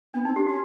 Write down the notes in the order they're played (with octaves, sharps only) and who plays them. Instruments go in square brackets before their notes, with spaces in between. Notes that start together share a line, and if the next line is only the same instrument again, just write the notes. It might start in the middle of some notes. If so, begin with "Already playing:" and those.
[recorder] B3 [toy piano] D4
[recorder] C4 [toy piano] D#4
[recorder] D4 [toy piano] G4
[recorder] C#4 [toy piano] F#4